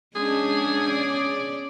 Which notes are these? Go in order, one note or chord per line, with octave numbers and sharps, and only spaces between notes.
G#3 C#4 D4 G#4
C#4 D5